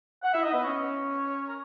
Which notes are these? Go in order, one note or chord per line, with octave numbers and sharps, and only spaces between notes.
F#5
E4 E5
D#4 D#5
B3 B4
C#4 C#5
A#4